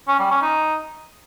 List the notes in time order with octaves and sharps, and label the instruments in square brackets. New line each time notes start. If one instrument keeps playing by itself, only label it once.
[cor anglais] C#4
G3
C#4
D#4